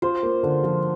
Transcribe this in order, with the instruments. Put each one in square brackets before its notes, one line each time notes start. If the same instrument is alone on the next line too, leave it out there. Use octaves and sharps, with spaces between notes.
[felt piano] F4 [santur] C5
[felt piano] A#3
D3
F3